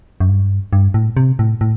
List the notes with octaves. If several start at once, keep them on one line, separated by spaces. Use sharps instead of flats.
F#2
G2
G2
A2
C3
A2
A2